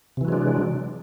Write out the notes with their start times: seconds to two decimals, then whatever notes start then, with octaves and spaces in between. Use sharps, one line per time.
0.17 C3
0.21 E3
0.25 F#3
0.28 G#3
0.32 D4